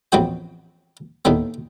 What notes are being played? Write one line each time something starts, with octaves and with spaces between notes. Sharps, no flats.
A1 F2 B3 C4 F#4 G5
D#2 A2 D#3 A3 B3